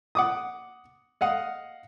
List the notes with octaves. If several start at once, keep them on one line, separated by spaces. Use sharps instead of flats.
F#5 D6 D#6
D#5 F5 F#5 D#6